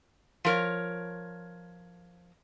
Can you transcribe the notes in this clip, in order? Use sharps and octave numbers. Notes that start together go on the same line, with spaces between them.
F3 A#4 C#5